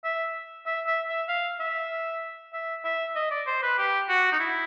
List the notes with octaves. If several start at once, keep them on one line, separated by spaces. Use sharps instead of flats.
E5
E5
E5
E5
F5
E5
E5
E5
D#5
D5
C5
B4
G4
F#4
D#4
E4